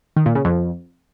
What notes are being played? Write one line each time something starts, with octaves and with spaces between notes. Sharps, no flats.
D#3
A#2
C#3
F2